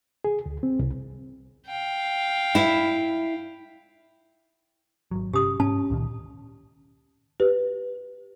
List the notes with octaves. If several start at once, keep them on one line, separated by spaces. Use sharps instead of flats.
G#4
D2
C4
C2
F5 G5
E4 E5
G#1 F#3
G2 C3 C#4 G4 D#6
G#2 C#4 A5
C#2 A#2 D#3
G4 B4